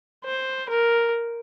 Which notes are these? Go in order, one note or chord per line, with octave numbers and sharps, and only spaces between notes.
C5
A#4